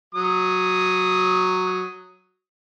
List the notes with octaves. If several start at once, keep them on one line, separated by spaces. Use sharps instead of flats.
F#3 D#6